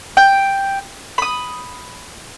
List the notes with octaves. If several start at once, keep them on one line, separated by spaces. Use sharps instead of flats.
G5
B5 D#6